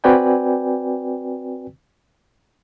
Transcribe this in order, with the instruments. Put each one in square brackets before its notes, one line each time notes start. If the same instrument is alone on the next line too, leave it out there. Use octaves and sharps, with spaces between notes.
[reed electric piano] C4 F#4 B4 D5 G5 G#5